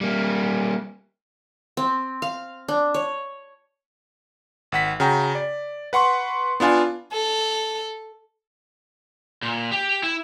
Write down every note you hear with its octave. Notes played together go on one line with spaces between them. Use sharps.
G3 A#3
C4
F5
D4
C#5
G#1 F#5 B6
C#3 F#4 G5 A#5
D5
B4 F#5 C6 C#6
B3 D4 F4 G#5
A4
A#2
G4
E4